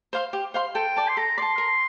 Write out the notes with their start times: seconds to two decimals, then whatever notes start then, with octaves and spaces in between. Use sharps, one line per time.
0.13 C5 F5 C6
0.33 G4
0.54 C5 F5 C6
0.75 A4 G5
0.97 D5 A5
1.08 C6
1.17 A4 A#5
1.38 D5 A5 C6
1.58 A#4